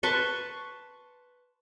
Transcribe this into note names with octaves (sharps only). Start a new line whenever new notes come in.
B4 A5 C6 C#6